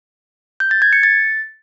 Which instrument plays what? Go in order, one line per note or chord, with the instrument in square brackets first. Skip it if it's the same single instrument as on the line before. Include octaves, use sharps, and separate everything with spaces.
[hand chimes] G6
A6
G#6
C#7
A6